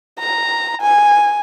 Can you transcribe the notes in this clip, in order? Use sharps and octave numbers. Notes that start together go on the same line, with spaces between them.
A#5
G#5